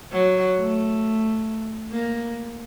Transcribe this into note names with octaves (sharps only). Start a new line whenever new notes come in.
F#3
A3
A#3